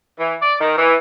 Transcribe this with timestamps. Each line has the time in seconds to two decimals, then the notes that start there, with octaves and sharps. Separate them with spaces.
0.18 E3
0.41 D5
0.60 D#3
0.76 E3